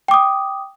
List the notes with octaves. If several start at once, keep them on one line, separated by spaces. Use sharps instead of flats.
G5 D6 D#6